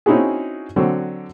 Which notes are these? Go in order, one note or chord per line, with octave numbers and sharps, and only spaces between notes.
C4 C#4 D#4 E4 F#4 G#4
D3 F#3 C4 F#4